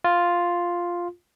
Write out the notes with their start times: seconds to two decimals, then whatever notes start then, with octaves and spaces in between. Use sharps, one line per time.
0.04 F4